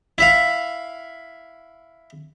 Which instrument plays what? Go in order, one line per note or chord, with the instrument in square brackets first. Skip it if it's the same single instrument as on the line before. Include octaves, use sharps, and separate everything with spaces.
[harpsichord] E4 E5 F5